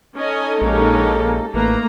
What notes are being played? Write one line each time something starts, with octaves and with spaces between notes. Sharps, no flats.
C#4 D#4 A4 D#5 G#5
A#1 G#3 A#3 C#4 G4
A1 A3 A#3 B4 A#5